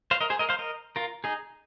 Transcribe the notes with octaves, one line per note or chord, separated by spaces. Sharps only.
C5 F5
A#4 D#5
G#4 C5
A#4 D#5
C5 F5
A#4 D#5
F4 A#4
D#4 G#4